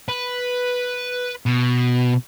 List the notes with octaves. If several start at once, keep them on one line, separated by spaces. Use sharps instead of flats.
B4
B2